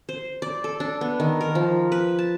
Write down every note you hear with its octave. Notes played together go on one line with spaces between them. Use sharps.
C5
D5
A4
D4
B3
D#3
A#4
F3
B4
A5